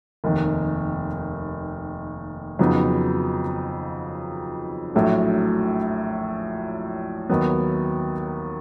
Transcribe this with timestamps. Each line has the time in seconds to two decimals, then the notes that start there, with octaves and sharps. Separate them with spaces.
0.24 F1 D#2 D#3
2.59 F2 C#3 F#3 B3 D#4
4.94 A#1 A2 F#3 A3 D4
7.29 D#2 D#3 F#3 B3